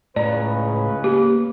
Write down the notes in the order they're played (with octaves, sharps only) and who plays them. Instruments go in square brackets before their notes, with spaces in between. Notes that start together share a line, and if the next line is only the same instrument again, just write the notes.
[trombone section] C#2 C#3 B4 [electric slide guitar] A2 A#5 [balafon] D5
[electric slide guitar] A#3 [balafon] G4